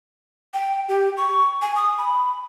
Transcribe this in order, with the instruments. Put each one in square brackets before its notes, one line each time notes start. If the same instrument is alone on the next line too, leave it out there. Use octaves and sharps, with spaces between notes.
[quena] G5
G4
C#6
G#5
D#6
B5